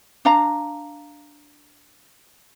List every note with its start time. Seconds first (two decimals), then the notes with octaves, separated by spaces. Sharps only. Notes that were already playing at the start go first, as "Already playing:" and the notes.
0.25 D4 F5 A#5